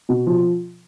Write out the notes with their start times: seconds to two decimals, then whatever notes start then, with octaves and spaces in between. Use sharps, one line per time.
0.09 B2
0.27 F3